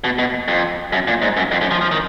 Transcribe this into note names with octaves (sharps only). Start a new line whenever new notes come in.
B2
B2
F2
F#2
A#2
G#2
F#2
F2
F#2
F3
F3
D#3